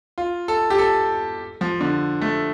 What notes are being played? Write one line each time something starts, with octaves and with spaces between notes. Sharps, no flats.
F4
A4
G4
A4
F3
D3
A3